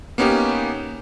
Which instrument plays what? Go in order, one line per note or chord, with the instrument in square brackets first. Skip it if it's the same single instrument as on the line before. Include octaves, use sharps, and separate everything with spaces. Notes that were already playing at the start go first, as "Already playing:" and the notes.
[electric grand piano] A#3 B3 C#4 D#4 G4